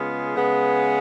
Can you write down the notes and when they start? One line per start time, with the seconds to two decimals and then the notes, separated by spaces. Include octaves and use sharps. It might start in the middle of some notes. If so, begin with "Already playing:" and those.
Already playing: C#3 G#3 B3 F4
0.35 C#3 G#3 B3